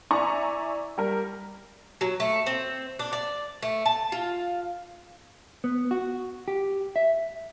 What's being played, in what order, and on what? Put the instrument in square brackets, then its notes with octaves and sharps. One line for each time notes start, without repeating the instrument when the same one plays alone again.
[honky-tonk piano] E4 D5 G#5 A#5 C#6
G3 A#4
[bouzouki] F#3
A3
C4
D4
D5
A3
A5
F4
[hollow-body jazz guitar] B3
F#4
G4
E5